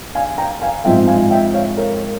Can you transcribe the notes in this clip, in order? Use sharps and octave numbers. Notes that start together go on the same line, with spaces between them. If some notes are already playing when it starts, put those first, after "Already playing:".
F5 G#5
G5 A#5
F5 G#5
G#2 F3 G#3 C4 E5 G5
F5 G#5
E5 G5
C#5 F5
A#4 C#5